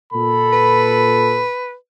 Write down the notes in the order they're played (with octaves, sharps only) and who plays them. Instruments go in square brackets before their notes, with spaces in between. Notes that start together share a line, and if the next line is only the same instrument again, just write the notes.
[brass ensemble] A#2 A4 [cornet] B5
[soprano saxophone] B4